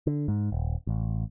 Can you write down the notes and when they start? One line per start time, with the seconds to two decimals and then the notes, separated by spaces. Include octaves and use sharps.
0.07 D3
0.28 G#2
0.52 D#1
0.87 A1